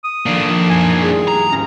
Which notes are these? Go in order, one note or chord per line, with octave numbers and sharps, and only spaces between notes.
D#6
D#3 F3 A#3 D4 A4
F#2 G#5
G3 E4 G#4
A#5
D#1 G#1 C#4 A#6